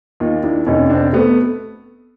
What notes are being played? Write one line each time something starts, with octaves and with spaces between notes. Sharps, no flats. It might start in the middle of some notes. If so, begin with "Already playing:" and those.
D#2 D#4 F4
D4 E4
F1 C#4 D#4
C4 D4
A3 B3